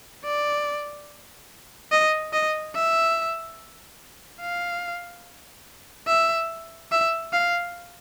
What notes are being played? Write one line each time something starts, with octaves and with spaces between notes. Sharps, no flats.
D5
D#5
D#5
E5
F5
E5
E5
F5